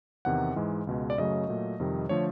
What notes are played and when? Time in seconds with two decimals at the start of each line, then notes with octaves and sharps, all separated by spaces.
0.25 E2 C3 D#3 F#5
0.56 G#2 E3 G#3
0.87 C#2 B2 G#3
1.10 D5
1.18 F#2 C#3 F#3 A3 D#5
1.49 A#2 F#3 A3
1.80 F2 C3 D#3 G3
2.09 D3 F3 A3 C#5